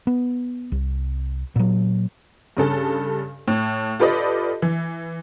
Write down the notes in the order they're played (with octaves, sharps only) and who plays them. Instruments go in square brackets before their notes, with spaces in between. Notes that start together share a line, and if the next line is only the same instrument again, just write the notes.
[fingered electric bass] B3
C2
A#2 F#3
[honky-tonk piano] G2 C#3 A4 A5
A2
F4 G4 A4 B4 D5 D#5
E3